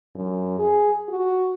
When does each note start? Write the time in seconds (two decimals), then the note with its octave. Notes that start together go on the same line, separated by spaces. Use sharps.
0.15 F#2
0.59 G#4
1.09 F#4